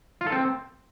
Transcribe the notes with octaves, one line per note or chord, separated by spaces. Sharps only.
F4
A4
C4